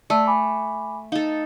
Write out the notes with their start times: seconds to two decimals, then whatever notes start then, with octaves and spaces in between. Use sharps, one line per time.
0.10 A3 D5 A5 E6
0.27 G#5 B5 D6
1.12 D#4 A4 F5